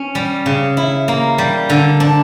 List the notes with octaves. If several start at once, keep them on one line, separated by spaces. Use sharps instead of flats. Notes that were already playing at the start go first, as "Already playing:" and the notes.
Already playing: C#4
G3
C#3
E4
A#3
G3
D3
D4